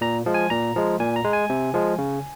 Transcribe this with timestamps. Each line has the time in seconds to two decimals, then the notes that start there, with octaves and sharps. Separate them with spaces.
0.01 A#2 A#5
0.26 F3 G#3
0.34 G#5
0.50 A#2 A#5
0.76 F3 G#3
1.00 A#2 G#5
1.16 A#5
1.24 G#3
1.33 G#5
1.50 C3
1.74 F3 G#3
1.98 C#3